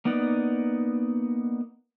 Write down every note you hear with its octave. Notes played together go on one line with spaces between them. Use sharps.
A#3 B3 D#4 D5 F#5